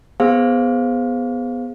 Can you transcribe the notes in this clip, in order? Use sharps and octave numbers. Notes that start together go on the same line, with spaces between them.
B3 G#4 C5 F5